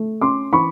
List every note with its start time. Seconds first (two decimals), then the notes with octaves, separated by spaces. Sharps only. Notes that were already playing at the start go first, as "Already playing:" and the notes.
Already playing: A3
0.21 C#4 C6 D6
0.53 E3 B5 C#6